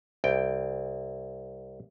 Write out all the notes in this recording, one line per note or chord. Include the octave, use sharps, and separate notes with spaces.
C2 G5